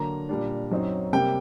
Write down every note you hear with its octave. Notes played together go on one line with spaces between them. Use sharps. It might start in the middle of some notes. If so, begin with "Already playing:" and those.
Already playing: D3 F#3 A#3 A#5
A#2 G3 D4
F#2 F#3 C4 D#4
C3 G3 A#3 G5